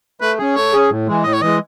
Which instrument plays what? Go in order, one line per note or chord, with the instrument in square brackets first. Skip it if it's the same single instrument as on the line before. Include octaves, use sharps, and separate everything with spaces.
[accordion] A3 [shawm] B4
[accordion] C#4 G#4
[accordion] A3 [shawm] C#5
[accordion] C#4 G#4
A2
E3 G#3
[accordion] A2 [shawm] D#5
[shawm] C#5
[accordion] E3 G#3 [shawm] D#5